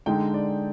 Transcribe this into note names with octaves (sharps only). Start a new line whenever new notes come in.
D3 G#3 D#4 G5
D5